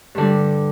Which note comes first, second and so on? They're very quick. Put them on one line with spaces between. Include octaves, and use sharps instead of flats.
G2 D3 G3